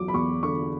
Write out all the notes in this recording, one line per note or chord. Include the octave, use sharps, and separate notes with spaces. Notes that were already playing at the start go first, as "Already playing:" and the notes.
Already playing: E2 F#3 D6
B5
E2 C#6
D3 C#6